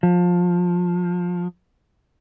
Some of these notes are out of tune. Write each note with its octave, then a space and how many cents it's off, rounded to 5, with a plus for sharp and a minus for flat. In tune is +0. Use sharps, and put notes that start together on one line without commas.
F3 +20